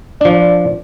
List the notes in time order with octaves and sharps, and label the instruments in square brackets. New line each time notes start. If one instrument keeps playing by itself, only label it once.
[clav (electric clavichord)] F3 D4 [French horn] D5